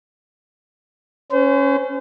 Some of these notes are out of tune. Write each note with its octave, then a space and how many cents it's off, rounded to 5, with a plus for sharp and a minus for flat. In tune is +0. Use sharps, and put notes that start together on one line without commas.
C#4 +0 C5 -40